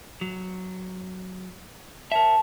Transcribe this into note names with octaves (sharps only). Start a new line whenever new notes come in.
F#3
A#4 C#5 E5 A5